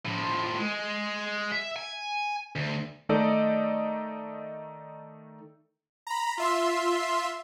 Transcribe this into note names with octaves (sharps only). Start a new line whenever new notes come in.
A2 F3
G#3
E5
G#5
D2
D#3 A3 D#4 A4 D5 D#5
A#5 B5
F4 E5 C6